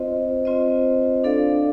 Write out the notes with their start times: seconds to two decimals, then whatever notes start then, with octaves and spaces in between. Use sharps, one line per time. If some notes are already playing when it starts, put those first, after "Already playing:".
Already playing: C4 F4 C5 D#5
0.45 C4 F4 C5 D#5
1.24 D4 A4 D5 F5